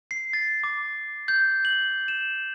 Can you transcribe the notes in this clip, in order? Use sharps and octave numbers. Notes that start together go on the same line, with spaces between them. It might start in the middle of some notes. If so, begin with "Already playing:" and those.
C7
A6
D6
G6
F#7
E7